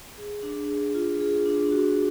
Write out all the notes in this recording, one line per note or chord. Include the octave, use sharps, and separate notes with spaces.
G#4
D4
G#4
F4
G#4
D4
F#4